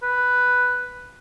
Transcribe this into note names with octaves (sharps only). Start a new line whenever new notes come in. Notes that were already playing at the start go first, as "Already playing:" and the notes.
B4